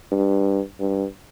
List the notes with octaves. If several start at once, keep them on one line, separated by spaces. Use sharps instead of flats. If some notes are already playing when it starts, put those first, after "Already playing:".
G2
G2